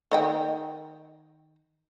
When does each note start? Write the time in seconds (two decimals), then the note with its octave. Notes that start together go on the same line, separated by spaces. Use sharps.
0.12 D#3 D#5 G5